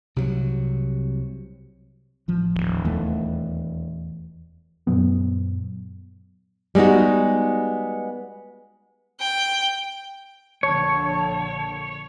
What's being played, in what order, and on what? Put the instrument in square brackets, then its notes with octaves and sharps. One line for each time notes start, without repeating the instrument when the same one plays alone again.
[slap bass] C2 C3 F3 F#3
[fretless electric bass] A1 F3
[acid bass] D#1
[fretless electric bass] E2 E3 A3
[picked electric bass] F#2 A#2 F#3 B3
[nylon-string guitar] G3 G#3 B3 D#4 F#4
[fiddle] G5
[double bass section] A#1 D3 [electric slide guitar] C#5 [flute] A5